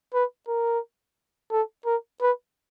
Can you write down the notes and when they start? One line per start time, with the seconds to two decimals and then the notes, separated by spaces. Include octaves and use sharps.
0.14 B4
0.48 A#4
1.52 A4
1.86 A#4
2.21 B4